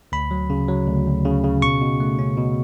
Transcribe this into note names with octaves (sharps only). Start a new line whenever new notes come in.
D2 B5
F#3
C#3
F#3
D2
D2
C#3
C#3
B2 C#6
B2
A3
C#4
B2